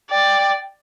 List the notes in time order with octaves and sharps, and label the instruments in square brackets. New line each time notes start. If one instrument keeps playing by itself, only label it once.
[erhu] D5 [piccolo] G5